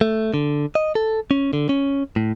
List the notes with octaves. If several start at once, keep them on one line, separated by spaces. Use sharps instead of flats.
A3
D3
D#5
A4
C#4
D3
C#4
A2